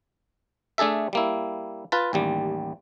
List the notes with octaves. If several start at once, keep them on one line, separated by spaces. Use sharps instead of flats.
A3 D4 G#4 A4 E5
G3 A#3 E4
F4 B4 A5
A1 D#2 G3